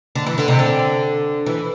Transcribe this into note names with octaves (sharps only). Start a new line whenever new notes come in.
D3
E3
D3
C3
D3
E3